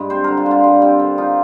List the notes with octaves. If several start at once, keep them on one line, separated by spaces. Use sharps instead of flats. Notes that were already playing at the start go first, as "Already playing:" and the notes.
Already playing: G2 G#3
C4 C5
D3 A#4
F4
D3
F4
G3
C4
D3
D#4 F4